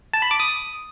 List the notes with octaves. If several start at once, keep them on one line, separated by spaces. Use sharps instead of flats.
A5
B5
D6
D#6